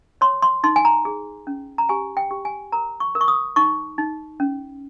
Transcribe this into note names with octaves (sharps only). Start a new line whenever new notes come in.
C#5 C6
C6
D#4 C6
G#5
A#5
G#4
C#4
A#5
G4 G#5
G5
G4
G#5
A#4 A#5
C#6
A#4
C#6
D#6
D#4 C#6
D#4
C#4